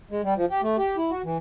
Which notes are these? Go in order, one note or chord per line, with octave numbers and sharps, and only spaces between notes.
G#3
G3
F3
G4
A3
G4
E4
F#4
E3